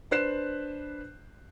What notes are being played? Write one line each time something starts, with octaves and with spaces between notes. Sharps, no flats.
D4 B4 C5 F#6 C7 E7